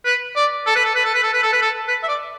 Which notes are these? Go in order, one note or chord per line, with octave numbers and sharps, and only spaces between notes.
B4
D5
A4
B4
A4
B4
A4
B4
A4
B4
A4
B4
A4
B4
E5
D5